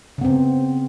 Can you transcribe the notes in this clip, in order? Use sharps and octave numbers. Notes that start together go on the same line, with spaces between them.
C#3 B3 C4